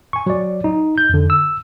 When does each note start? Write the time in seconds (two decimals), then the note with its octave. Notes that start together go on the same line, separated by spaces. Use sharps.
0.13 G#5 C#6
0.26 F#3 D5
0.64 D#4
0.98 G6
1.09 F2 D3
1.30 E6